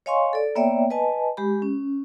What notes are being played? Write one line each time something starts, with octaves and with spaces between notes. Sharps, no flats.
C#5 D#5 F5 G#5 C6 C#6
A4 D5
A#3 B3 C#5 D5 E5 G5
B4 D#5 G#5 A5
G#3 G4 B5
C#4